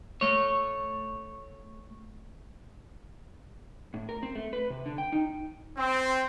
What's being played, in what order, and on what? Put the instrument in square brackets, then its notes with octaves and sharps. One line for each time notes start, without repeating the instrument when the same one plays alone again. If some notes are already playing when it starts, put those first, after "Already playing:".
[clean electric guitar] A3 C#5
[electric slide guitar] A2
A#4
C4
A3
B4
C3
D3
G5
D#4
[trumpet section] C4